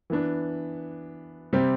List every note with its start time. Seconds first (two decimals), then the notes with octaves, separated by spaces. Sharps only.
0.10 E3 B3 D4
1.53 C3 G3 C4